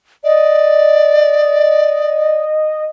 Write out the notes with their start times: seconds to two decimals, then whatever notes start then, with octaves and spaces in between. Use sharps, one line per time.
0.24 D5 D#5